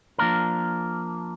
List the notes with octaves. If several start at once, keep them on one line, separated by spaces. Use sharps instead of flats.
F3 A#3 D4 A#4